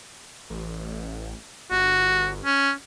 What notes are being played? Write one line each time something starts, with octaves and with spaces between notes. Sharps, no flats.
A1
G1 F#4
C#4